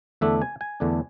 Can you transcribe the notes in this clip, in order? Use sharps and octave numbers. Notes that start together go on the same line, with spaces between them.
E2 D3 A3 D4 E5
G#5
G#5
E2 D3 A3 D4